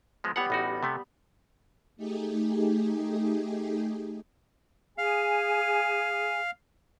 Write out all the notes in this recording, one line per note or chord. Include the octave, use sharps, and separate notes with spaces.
F3 G#3 B3
G3 B3 C#5 F#5 B5
A1 D#4 F#4
C3 A3 B3
A3 D#4 G4 G#4
G#4 F5 G#5